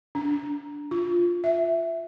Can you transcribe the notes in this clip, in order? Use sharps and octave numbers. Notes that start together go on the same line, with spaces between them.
D4
F4
E5